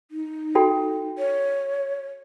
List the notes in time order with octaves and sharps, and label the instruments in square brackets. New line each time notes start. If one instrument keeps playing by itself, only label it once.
[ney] D#4
[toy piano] F#4 A4 G5
[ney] C#5